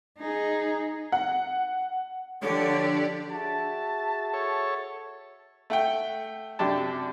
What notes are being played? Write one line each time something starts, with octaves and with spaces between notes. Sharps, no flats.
D#4 G#4
F#5
D3 F3 D4 G4 C#5 D5
F#4 G#4 E5 A5
A4 C#5
A3 F#5 G5
F#2 C3 D4 G5 A5